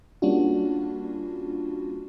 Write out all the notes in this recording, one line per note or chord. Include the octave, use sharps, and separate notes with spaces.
G3 A#3 C#4 D4 F4 F#4